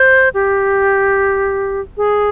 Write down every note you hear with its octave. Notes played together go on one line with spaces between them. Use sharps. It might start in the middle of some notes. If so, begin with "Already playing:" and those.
Already playing: C5
G4
G#4